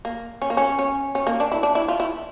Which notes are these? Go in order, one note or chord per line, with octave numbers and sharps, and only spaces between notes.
A#3
C#4
A#3
C#4
C#4
C#4
A#3
D4
E4
D4
E4
F4
E4